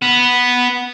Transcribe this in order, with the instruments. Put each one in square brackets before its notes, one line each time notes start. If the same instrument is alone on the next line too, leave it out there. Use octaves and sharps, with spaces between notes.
[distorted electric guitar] B3